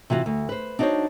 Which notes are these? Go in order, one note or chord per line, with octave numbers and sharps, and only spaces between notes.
C3 E3 F4 F#4
D2
B4 C5
D4 D#4 F#4 A#4 C5 C#5